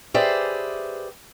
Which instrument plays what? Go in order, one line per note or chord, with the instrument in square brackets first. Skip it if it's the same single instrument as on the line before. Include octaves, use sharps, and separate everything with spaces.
[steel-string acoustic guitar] G4 G#4 B4 C5 D5 E5